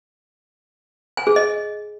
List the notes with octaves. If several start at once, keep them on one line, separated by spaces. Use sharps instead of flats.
G#5
G#4
D#5